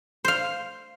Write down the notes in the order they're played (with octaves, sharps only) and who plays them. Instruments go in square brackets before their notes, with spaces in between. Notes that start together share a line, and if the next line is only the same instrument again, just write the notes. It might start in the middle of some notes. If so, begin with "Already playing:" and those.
[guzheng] C5 F5